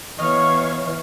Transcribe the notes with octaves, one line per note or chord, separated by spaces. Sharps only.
E3 B3 C#5 D#5 F5 C#6 F6